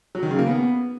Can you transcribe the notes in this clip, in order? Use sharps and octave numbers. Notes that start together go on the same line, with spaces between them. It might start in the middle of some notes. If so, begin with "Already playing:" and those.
F#3
D#3
C#3
A#3
B3